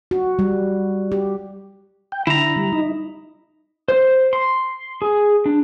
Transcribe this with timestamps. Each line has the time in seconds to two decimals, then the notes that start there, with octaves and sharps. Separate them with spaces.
0.11 F#4
0.39 G3
1.12 G4
2.12 G5
2.27 D3 E4 A#5
2.57 G3
2.73 D#4
3.88 C5
4.33 C6
5.02 G#4
5.46 D4